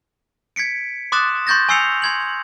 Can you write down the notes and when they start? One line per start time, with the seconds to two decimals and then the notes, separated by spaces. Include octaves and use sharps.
0.56 G#6 B6 C#7 D7
1.12 C6 D6 D#6 F#6 A6 E7
1.47 C6 C#6 G6 A6 A#6
1.69 G#5 C#6 E6 C7 C#7 F7
2.02 C6 G#6 F#7